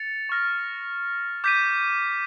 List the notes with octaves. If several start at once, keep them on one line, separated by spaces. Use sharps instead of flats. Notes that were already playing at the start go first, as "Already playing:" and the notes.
Already playing: A6 C#7 F7
C#6 F6 A#6
D6 G6 B6 D#7